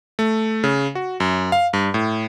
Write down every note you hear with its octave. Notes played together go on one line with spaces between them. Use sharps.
A3
C#3
F#4
F#2
F5
G2
A2